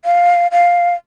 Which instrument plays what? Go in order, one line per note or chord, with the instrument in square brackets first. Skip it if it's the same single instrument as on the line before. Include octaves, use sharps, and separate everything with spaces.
[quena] F5
F5